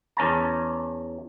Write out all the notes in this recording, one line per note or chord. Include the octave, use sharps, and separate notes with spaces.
E2 C#4 A5 A#5